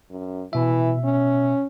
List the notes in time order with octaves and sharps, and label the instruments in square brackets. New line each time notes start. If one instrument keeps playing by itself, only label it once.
[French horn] F#2
[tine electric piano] B2 E5 [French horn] E3
[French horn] C#4